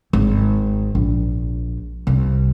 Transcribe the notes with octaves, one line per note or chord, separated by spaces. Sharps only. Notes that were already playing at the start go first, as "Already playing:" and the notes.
G#1
A#1
C2